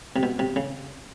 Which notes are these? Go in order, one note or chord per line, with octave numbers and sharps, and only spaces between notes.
C3
B2
C3
C#3